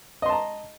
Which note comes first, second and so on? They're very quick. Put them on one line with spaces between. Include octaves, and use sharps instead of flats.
D#5 C6 A5 A#5